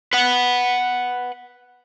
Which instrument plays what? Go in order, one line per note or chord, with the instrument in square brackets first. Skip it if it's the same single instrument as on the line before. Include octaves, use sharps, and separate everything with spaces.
[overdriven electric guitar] B4 F#5